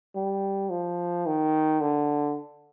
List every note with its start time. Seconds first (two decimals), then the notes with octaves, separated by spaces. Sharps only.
0.15 G3
0.70 F3
1.26 D#3
1.81 D3